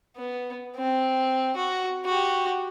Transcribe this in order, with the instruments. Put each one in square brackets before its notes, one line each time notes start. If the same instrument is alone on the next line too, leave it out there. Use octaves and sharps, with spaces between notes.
[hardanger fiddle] B3
C4
F#4
F#4 G4